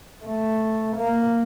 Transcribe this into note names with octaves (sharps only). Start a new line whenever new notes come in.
A3
A#3